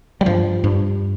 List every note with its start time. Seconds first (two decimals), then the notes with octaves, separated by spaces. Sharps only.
0.21 G3
0.26 G2 F3
0.64 G2